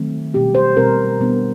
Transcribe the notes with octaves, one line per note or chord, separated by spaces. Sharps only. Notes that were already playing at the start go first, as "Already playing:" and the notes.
Already playing: D#3 F#3 A3 C4
B2 G3 C4 G4
C5
B2 G3 C4 A#4
B2 G3 B3 D4